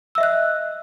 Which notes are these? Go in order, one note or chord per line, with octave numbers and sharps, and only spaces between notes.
D#5 E5 E6 F#6